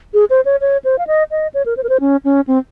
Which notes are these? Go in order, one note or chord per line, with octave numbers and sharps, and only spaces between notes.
G#4
C5
C#5
C#5
C5
F5
D#5
D#5
C#5
A#4
C5
A#4
C5
C#4
C#4
C4